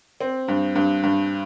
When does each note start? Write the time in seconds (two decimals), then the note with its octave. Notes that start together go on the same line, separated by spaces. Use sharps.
0.21 C4
0.48 G2
0.75 G2
1.03 G2